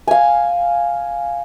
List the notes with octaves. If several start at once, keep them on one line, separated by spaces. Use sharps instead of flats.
F5 G#5